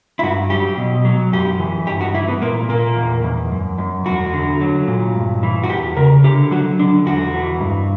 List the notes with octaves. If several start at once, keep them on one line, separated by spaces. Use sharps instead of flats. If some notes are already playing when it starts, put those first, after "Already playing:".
E4
G2 F#4
F#3 G4
B2
F#3
F#2 G4
E3
G2 G4
F#4
E3 E4
B3
A#2 A#3
A#2 A#3
E2
E2
F#2
F#2
E2 F#4
D3
F#3
A#2
G2
E3
F#4
E2 G4
C#3 A#4
D3 G4
F#3 F#4
D3 D4
E2 F#4
E3
G2